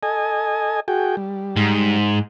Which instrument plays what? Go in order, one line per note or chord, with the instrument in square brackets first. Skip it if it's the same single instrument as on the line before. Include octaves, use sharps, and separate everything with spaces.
[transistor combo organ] A4 D#5 G#5
F#4 G#4 G5
G3
[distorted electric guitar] G#2